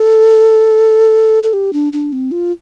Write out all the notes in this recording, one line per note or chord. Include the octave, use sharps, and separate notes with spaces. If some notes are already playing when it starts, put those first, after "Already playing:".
Already playing: A4
A4
G4
D4
D4
C4
F4